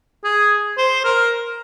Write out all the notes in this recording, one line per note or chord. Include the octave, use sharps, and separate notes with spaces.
G#4
C5
A#4